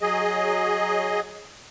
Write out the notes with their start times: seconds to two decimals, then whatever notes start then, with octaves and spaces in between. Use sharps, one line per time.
0.02 F#3 G#4 D#5